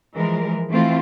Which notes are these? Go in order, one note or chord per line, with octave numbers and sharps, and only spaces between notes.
E3 F3 G#3 A#4
E3 A3 C4 F4